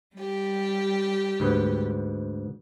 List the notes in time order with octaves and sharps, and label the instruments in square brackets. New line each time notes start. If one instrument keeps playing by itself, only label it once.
[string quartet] G3 G4
[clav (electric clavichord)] D2 G#2 B4